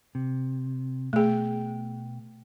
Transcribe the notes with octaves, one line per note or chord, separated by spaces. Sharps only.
C3
B2 A3 G#4 G5